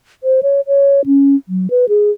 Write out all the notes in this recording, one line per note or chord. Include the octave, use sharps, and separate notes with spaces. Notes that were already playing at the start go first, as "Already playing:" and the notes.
C5
C#5
C#5
C#4
F#3
B4
G#4